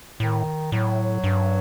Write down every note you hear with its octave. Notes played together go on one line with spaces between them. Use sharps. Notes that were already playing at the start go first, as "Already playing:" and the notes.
A2 D#3
A2 F#3
G2